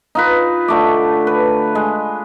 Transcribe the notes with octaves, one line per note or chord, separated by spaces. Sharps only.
D#4 F4 B4
D3 A3 D6
B4
G#3